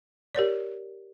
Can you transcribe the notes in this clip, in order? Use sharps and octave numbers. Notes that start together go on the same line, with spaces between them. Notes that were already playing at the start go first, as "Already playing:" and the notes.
G4 A#4 C#5 D5